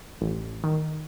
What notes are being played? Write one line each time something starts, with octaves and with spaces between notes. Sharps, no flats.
A1
D#3